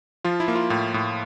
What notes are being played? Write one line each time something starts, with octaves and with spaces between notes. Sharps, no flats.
F3 F4
E4
A#3
F4
A2
A2